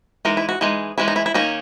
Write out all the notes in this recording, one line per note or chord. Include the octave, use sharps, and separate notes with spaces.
E3 G#3 D#4 A#4
E4
F#4
E3 G#3 D#4 G#4
E3 G#3 C#4 E4
D#4
E4
E4
D#3 A#3 C#4 D#4